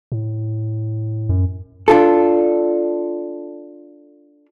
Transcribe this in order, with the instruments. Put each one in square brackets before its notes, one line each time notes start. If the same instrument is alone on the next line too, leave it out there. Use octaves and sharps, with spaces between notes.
[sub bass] A2
[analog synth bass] F#2
[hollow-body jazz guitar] D4 F4 A4